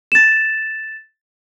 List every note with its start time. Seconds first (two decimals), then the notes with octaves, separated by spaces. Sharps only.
0.12 A6 E7